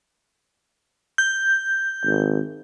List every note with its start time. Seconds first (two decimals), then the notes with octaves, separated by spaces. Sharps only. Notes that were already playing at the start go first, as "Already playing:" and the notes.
1.18 G6
2.05 G#1